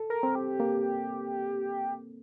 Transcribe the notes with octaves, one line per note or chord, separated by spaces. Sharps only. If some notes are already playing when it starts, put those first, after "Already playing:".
Already playing: A4
A#4
C4
G4
A#3